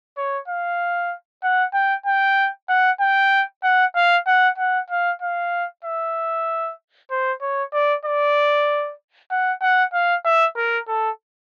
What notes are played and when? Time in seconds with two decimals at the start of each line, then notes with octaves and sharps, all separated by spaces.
0.17 C#5
0.48 F5
1.43 F#5
1.74 G5
2.06 G5
2.69 F#5
3.00 G5
3.63 F#5
3.95 F5
4.27 F#5
4.58 F#5
4.90 F5
5.22 F5
5.84 E5
7.10 C5
7.41 C#5
7.73 D5
8.05 D5
9.31 F#5
9.62 F#5
9.93 F5
10.25 E5
10.57 A#4
10.88 A4